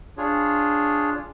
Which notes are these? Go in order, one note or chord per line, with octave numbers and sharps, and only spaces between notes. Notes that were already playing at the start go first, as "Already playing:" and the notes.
D4 F4 G#4 C#5